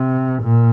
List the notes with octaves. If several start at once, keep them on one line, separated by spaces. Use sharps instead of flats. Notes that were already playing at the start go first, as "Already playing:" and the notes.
Already playing: C3
A#2